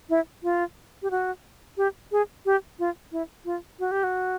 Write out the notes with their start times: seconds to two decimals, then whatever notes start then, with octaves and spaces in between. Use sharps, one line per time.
0.09 E4
0.43 F4
1.02 G4
1.11 F#4
1.77 G4
2.12 G#4
2.46 G4
2.79 F4
3.12 E4
3.45 F4
3.79 F#4
3.91 G4
4.04 F#4